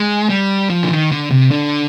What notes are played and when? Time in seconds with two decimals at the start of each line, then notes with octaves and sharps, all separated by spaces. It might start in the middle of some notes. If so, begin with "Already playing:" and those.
Already playing: G#3
0.29 G3
0.70 F3
0.83 D3
0.91 D#3
1.11 D3
1.31 C3
1.51 D3